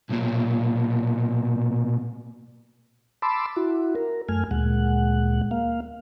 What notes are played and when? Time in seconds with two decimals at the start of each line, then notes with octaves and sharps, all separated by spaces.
0.10 B1 A#2
3.22 A5 B5 C6 D6 E6
3.56 E4 F#4
3.95 A#4
4.29 F#2 A3 G#5 F6
4.51 D2 A#2 G#3 F#5
5.51 A#3 F5